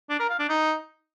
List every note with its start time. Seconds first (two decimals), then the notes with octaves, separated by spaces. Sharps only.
0.10 D4
0.20 A#4
0.29 F5
0.39 D4
0.49 D#4